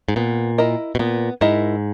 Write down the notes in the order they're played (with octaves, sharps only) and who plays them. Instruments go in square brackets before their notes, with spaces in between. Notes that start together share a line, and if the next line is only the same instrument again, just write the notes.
[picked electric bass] G#2
[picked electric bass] A#2 [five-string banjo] B3
[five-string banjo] E4 A#4 D#5
[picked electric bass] B2
[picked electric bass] A#2 [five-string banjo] B3
[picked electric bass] G#2 [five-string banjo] E4 A#4 D#5